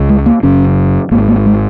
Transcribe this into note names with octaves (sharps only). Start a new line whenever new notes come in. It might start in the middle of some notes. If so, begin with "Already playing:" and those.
Already playing: C#2 C#3
G#3
A#3
F#1 F#2 C#3 C#4
G#1 G#2 A#3
A#3
G#3